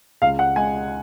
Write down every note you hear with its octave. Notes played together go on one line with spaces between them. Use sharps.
C#2 F5
F#5
G#3 G#5